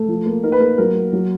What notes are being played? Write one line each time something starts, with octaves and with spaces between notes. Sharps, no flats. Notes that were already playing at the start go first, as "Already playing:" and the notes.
Already playing: A3
F3
A#3
D#4 A#4
B4
A#3 A#4
F#3 A#4
A#3
F#3